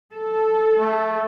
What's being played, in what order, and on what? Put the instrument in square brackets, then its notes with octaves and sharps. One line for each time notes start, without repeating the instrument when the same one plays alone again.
[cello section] A4
[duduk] A3